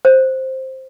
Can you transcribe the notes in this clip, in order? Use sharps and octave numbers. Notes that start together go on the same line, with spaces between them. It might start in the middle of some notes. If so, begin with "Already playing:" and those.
C5